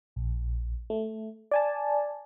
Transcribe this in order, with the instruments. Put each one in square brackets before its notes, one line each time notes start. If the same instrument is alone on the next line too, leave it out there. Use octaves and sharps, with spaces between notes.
[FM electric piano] A#1
A3
D5 G#5 A5